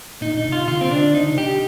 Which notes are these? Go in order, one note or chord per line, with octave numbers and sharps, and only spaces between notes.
A#2 D#4
A#2 D#4
C3
F4
D3 F4
C4
D4
D#4
D3
C3
G4
C3